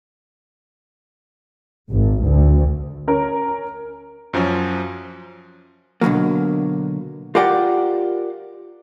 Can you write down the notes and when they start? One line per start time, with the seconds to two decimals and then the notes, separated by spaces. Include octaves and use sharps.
1.91 G#1
2.23 D2
3.08 C#4 A#4
4.33 F#2 F3 F#3 C#4
6.01 B2 D3 D#3 F#3 A#3
7.35 F4 G4 A#4 D5 F#5 G5